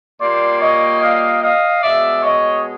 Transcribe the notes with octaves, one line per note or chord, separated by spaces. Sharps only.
A#2 G3 A#3 C5 D5
C#5 D#5
D#5 F5
D#5 F5
B2 G#3 D5 E5
C#5 D#5